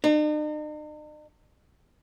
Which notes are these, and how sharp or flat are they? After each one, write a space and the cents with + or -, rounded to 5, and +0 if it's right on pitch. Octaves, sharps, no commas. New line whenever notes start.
D#4 -45